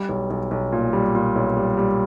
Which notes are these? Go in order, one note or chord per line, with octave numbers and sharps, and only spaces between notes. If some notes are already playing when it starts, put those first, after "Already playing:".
Already playing: G3
B1
B1
B1
A#2
G3
A#2
B1
G3
G3